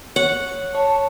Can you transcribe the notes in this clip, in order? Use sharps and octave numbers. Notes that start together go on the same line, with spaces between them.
C#5 F#5
C#5 A5